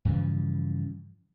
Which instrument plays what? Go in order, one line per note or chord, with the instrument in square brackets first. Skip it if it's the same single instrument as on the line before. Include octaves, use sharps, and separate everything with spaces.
[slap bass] G2 C#3 E3 F3